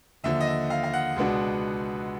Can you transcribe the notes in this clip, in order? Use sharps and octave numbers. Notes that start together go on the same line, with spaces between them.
D#2 D3 F3 E5
D#5
E5
F5
F5
F#5
C#2 B2 G#3 B3 D4